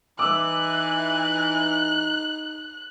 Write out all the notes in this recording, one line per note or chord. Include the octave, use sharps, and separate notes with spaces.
E3 D#4 D6 E6 F#6